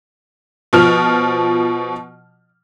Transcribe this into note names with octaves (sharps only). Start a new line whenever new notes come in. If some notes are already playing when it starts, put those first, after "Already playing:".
B2 F3 F6